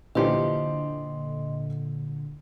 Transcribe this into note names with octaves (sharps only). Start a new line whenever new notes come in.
A#2 D3 E3 F3 G4 D#5 C6